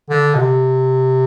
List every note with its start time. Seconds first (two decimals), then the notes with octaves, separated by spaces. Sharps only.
0.10 D3
0.34 B2
0.39 C3